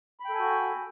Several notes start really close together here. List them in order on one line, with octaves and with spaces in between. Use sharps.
B5 G5 A4 G#5 F#4